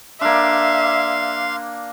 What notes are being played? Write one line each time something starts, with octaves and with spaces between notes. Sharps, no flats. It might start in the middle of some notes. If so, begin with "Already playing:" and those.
A#3 D4 E5 F5 C6